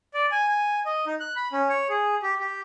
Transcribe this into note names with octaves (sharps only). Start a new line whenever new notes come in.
D5
G#5
G#5
D#5
D#4
F#6
B5
C#4
C#5
G#4
G4
G4